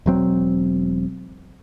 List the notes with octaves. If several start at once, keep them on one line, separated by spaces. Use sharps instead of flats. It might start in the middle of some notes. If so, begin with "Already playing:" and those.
E1 F#3 C4